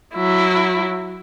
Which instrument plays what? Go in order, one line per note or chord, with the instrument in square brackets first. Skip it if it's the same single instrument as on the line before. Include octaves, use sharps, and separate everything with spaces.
[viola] F#3 E4